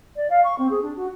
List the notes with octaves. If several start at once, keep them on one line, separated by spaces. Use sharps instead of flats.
D5
F5
C#6
C4
G#4
D4
F#4